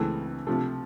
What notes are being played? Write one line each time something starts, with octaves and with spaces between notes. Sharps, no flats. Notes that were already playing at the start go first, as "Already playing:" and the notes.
Already playing: C#2 C#3 E3 A3 C4
C3 F3 A3